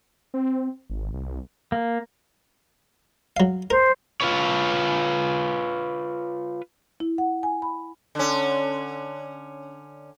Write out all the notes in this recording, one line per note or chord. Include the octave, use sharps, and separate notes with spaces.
C4
G#1
C2
A#3
F#3 F5
A#4 C5
F4 B4 C#5
E4
F#5
G#5
B5
D3 C#4